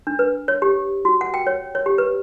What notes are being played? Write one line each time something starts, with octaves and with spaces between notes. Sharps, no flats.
D4
B4
C#5
G4
F#4
F#5
G5
C#5
C#5
G4
B4